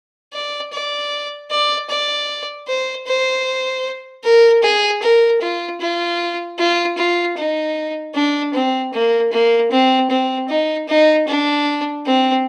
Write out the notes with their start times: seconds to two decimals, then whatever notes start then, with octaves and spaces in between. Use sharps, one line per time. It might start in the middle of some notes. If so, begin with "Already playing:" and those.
0.33 D5
0.72 D5
1.50 D5
1.89 D5
2.67 C5
3.06 C5
4.24 A#4
4.63 G#4
5.02 A#4
5.41 F4
5.80 F4
6.58 F4
6.97 F4
7.37 D#4
8.14 D4
8.54 C4
8.93 A#3
9.32 A#3
9.71 C4
10.10 C4
10.49 D#4
10.88 D#4
11.27 D4
12.05 C4